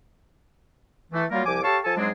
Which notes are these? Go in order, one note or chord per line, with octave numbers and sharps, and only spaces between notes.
E3 A3
F#3 G3 A#3 F4 A#4 F5
C2 F3 G#5 D6
G4 A4 C#5 F5 A5 C#6
F3 A4 G#5 A5
G#2 F#3 G#3 C4 D4 G#4